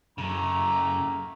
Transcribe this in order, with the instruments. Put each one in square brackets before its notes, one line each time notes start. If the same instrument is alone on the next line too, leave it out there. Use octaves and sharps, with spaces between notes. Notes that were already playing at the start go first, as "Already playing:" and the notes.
[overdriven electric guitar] F#2 C#3 [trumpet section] A3 A#3 A#5